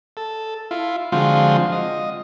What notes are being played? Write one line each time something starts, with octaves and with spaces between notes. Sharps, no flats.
A4
E4 F4
D3 F3 G#3 C4 F4 F#4
D#5